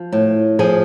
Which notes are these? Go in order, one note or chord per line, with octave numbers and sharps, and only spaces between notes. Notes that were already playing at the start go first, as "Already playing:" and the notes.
Already playing: F3
A2
F3 G#4